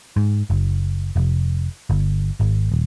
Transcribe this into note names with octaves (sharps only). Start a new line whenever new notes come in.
G#2
F#1
F1
G1
G#1
D#1